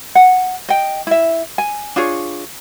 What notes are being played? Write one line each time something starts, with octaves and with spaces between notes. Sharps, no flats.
F#5
D#5 G5
E4 E5
G#5
D4 F4 G#4 C#5